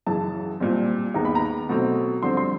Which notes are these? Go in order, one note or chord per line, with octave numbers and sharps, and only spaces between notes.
F#2 C#3 E3 A5
A#2 G3 C4
D#2 D#3 G#3 B3 A#5
B5
A#5
B2 F#3 A3 C4
F2 D3 G3 C4 C6
C6